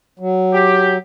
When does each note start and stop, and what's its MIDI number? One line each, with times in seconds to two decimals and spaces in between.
0.19 0.98 54
0.54 0.94 67